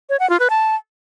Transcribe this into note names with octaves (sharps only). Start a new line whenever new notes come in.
C#5
F#5
F4
B4
A5